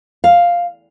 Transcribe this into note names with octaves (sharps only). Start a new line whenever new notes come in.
F5